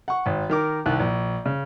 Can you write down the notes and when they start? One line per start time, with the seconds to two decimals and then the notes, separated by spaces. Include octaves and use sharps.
0.08 F#5 C#6
0.26 G#1
0.50 D#3 A#4 D6
0.86 C2 D#3 F#6
1.00 A#1
1.46 C#3